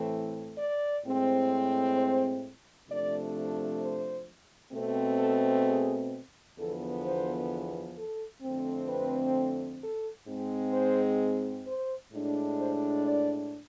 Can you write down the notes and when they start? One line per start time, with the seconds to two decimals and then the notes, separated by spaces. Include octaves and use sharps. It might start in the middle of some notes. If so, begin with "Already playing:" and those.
Already playing: A2 E3 A3 C4
0.57 D5
1.04 A2 G#3 C4
1.96 C5
2.88 C3 F3 A3 D4 D5
3.80 C5
4.72 B2 A3 C4
5.18 A4
5.65 G#4
6.57 E2 D3 F3 B3 A4
7.03 C5
7.95 A4
8.42 F2 D3 A3 C4
8.88 B4
9.81 A4
10.27 G#2 G#3 C4
10.73 C5
11.65 C5
12.12 A2 G#3 D4
12.58 C5
13.04 D5